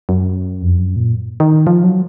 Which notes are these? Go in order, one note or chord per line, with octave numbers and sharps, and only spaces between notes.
F#2
F2
F#2
A#2
D#3
F3
F#3